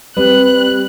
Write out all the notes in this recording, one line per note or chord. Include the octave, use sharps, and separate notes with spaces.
G3 C4 B4 F#6